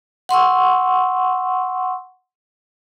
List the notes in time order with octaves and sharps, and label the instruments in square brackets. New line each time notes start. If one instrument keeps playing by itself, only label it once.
[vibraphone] F#5 C6 C#6 E6